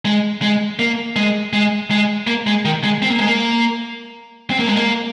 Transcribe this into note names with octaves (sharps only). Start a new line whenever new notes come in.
G#3
G#3
A#3
G#3
G#3
G#3
A#3
G#3
D#3
G#3
C4
A#3
G#3
A#3
C4
A#3
G#3
A#3